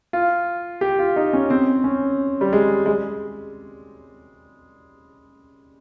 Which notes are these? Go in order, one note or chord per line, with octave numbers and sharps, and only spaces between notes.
F4
G4
F4
D#4
C#4
C4
C#4
G3
G#3
G#3